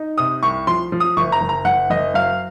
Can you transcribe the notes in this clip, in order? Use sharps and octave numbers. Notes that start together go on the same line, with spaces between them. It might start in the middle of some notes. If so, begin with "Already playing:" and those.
Already playing: D#4
C3 D#6
C2 C#6
F3 C6
F3
D#6
F#1 C#6
A#5
F#1
A#5
F#1 F#5
F#1 D#5
F#3 F5